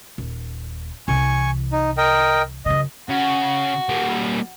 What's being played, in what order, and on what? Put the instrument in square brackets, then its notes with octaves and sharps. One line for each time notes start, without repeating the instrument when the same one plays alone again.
[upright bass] D#1
[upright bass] C2 E3 [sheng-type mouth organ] G#5 C#6
[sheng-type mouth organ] D#4
A#4 D#5 G5
[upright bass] F#2 C#3 [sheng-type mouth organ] D#5
[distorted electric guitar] C#3 [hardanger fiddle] F#4
[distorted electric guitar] G3 A#3